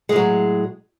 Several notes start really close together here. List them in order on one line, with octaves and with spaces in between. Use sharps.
G#3 A2 F#3